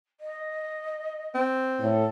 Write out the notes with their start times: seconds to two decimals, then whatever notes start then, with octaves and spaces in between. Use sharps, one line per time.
0.20 D#5
1.35 C4
1.80 A2 A4